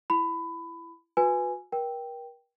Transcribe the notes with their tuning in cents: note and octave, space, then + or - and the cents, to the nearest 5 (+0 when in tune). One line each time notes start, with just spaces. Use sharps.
E4 +20 B5 +20
F#4 -35 B4 +0 G#5 +0
A#4 +35 G5 +0